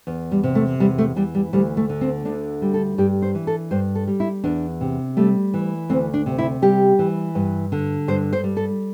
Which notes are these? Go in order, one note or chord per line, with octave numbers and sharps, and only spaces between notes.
E2
G3
C3
A3
E2 G3
A3
E3 G3
G3
D2 G3
A3
D3
C4
D2 D4
G3
A4
G2 G4
C5
E3
A4
G2 C5
A4
G3
E4
E2 D4
C3
G3 A3
E3
D2 C4
D4
C3
E4
G3 G4
E3
G2
D3
G2 C5
C5
G3
A4